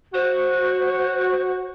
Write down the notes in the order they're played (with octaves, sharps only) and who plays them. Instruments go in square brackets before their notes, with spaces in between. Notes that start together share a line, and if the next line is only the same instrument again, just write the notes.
[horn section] F#4 [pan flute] C5